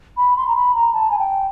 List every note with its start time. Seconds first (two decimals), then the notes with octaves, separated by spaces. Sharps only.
0.17 B5
0.37 C6
0.47 A#5
0.56 B5
0.75 A#5
0.94 A5
1.11 G#5
1.19 G5